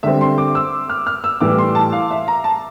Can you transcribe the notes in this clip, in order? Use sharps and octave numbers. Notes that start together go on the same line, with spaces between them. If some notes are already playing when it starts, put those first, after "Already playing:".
D3 G3 C4 E5
C6
D6
E6
F6
F6
E6
A2 E3 G3 D6
C6
A5
F5
E5
A#5
A5